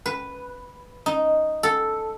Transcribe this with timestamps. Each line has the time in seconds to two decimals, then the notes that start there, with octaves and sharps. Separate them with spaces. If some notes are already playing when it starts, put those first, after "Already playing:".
0.06 B4
1.06 D#4
1.63 A4